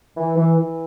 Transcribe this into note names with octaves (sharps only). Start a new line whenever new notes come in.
E3
E3
E3